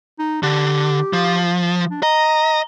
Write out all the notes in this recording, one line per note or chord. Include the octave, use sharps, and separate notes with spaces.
D#4
D3 G4
F3
D4
D#5 A#5